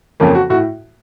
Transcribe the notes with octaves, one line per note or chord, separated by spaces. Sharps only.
F2 C#3 F3 A#3 C#4
F#4
A2 F#4